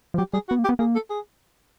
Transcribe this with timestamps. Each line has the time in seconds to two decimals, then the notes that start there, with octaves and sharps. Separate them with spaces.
0.14 F3
0.18 F#3 G4
0.33 G3 G#4
0.49 B3 F#4
0.59 A#3
0.64 G4
0.69 B3
0.79 A#3 G#4
0.95 A4
1.10 G#4